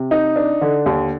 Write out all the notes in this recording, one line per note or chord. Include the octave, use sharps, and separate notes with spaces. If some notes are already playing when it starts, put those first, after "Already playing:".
Already playing: C3
D#4
D4
D3
D#2